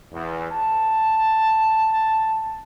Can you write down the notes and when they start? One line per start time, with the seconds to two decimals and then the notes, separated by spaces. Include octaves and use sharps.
0.13 E2
0.52 A5